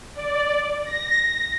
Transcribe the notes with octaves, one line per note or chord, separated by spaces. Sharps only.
D5
A#6